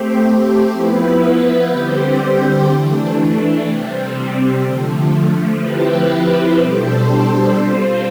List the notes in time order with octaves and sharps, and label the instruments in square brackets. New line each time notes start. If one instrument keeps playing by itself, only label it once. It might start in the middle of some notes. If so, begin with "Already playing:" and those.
Already playing: [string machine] A3 C4 G4 C5
F3 B3 E4 B4
D3 G3 C4 G4 C5
E3 A3 D4
C3 G3 C4
D3 F3 A3
F3 C4 E4 G4 B4
B2 G3 D4 A4 C5
G3 C4 F4 C5